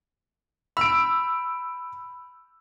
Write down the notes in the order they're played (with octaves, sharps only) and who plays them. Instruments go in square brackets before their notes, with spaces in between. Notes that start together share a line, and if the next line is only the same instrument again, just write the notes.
[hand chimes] B5 [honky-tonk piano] E6 D7